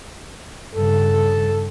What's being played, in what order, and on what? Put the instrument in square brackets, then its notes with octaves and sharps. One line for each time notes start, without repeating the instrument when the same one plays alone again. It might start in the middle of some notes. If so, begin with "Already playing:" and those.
[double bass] G2 C#3 [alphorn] A4